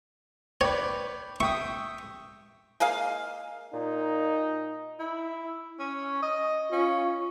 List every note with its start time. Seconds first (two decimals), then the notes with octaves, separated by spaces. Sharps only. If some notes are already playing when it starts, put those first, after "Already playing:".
0.61 B4 C#5 D5 G5
1.40 E5 G5 C#6 D#6
2.80 G#3 A#3 G#4 F5
3.74 A#2 D#4
4.99 E4
5.79 C#4
6.22 D#5
6.72 C#4 F4